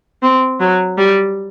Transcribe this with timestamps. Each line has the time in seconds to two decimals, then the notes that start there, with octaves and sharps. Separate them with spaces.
0.23 C4
0.61 F#3
0.98 G3